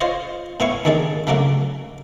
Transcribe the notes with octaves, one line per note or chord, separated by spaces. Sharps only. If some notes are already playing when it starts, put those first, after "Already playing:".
F4 C5 C#5 D#5
A2 B3 E4 F5 G#5 C#6
D#2 D#3 D4 G#4 D5
C#3 F#3 A3 A#3 D4 F#4